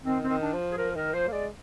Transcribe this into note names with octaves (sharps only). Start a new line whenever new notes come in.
D#3 C4
C4
D#3
D4
F3
G#4
F3 A#4
D#3 A#4
F3 C5
A#3
G#3 D5